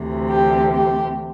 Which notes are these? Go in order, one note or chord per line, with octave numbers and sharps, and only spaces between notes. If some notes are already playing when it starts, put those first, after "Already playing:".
Already playing: D2 C3 E3
G4
G4